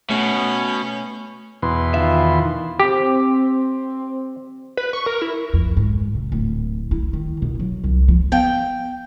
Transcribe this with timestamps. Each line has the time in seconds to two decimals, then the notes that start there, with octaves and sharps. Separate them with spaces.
0.10 B2 A3 C#4
1.62 E2 B2 C6
1.94 D#3 F4 E5
2.80 C4 G4
4.77 B4
4.93 C#6
5.06 A#4
5.22 E4
5.53 F2
5.77 G#2
6.15 C3
6.32 D1
6.91 E4
7.13 D#3
7.42 B2
7.59 F#3
7.84 C2
8.08 F3
8.32 B3 F5 G5